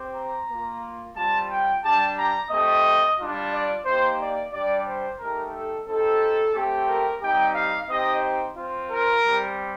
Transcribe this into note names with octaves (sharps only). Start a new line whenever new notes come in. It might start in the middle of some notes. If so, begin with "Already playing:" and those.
Already playing: C4 G4
A#5
A#3 F4
G3 C4 F4 A5
G5
G3 D4 G4 A5
A#5
A3 C4 G4 D#5
G3 D4 F4
D5
A#3 D#4 G4 C5
D5
G3 D4 G4 D5
C5
A3 D#4 G4 A#4
A4
C4 D#4 G4 A4
A3 C4 G4
A#4
G3 C4 D#4 G4 G5
F5
C4 D#4 G4 D#5
C4 F4
A#4
G3 C4 G4